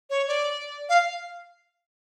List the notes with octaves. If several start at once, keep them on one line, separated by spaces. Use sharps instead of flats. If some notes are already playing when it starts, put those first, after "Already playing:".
C#5
D5
F5